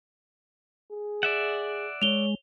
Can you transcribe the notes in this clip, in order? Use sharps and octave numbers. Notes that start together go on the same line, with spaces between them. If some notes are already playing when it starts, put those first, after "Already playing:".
G#4
D5 E5 F#5
G#3 C#5 F7 G7